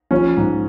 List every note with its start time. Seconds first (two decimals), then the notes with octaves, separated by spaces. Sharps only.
0.11 F3 C#4
0.37 G#2